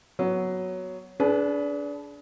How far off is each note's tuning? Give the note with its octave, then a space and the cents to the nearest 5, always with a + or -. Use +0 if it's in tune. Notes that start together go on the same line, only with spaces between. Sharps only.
F#3 +0 B3 +0
D4 -25 G#4 +30 B4 +0